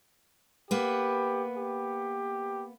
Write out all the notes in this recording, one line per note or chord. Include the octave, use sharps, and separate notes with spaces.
A#3 B3 G4 B4
G4